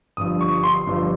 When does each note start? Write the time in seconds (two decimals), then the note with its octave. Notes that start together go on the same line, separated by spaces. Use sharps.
0.17 G1 G2 F3 D#6
0.41 C#6
0.64 C6
0.86 G1 G2 F3